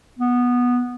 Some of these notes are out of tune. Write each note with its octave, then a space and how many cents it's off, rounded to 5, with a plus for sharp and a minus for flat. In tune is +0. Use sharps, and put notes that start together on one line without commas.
B3 -10